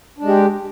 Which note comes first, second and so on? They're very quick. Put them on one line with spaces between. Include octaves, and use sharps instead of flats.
D4 G#3 G4